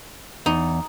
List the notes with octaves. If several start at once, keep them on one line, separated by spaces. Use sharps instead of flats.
E2 D#4